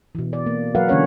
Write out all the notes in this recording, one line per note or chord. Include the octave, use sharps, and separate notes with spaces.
B2 E3
D5
A#3
F#3 A#4 B4 F5 F#5
D3 E3 A#3 C#4 C#5 F#5